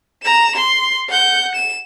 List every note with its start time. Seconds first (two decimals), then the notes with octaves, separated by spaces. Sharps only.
0.23 A#5 E7
0.56 C6
1.09 F#5 G6
1.55 E7